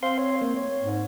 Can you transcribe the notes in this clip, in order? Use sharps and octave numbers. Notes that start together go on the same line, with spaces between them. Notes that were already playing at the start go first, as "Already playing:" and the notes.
C4 C5 F5 C6
C#5
A#3
C#5
G#2